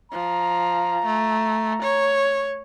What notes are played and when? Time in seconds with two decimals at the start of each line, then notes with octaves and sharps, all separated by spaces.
0.12 F3 A#5
1.06 A3
1.82 C#5